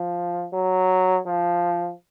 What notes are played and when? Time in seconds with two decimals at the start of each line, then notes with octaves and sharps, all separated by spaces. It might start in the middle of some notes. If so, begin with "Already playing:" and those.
Already playing: F3
0.53 F#3
1.26 F3